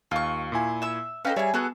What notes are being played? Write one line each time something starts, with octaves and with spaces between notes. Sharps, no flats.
D#2 F4 C#6
A#2 E4 G#5
E5 E6
C#4 D#4 A4 B4 F5 G5
G3 G#4 C#5 E5 G#5
B3 F#4 G#4 A4